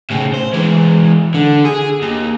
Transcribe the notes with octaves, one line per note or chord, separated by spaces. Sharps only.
A2 C#3
C5
E3 G#3
D3
G#4
D#2